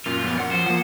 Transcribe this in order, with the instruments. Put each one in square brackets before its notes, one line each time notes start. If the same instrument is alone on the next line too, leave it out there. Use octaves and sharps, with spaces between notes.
[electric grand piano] F#2 A#2 [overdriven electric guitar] F4
[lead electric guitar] F3 B3
F#5
[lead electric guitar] F3 [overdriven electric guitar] C5
[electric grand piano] F3 A#3 [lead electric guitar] F#5